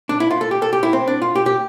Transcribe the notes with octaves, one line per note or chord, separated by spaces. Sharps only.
D4
E4
F4
A4
G4
A4
G4
E4
C4
D4
F4
G4
G4